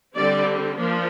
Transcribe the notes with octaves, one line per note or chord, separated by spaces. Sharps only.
D3 G3 C4 D5
F3 A#3 D4